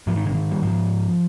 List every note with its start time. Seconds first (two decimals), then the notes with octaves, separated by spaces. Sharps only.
0.07 G#2 F3
0.16 D#3
0.26 D3
0.35 D#3
0.51 G3
0.62 G#2 F3